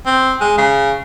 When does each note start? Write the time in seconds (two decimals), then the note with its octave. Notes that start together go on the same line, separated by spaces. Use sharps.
0.06 C4
0.41 G#3
0.58 C#3